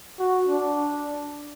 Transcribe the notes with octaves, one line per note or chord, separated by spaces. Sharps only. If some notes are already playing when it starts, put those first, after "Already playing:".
F#4
D4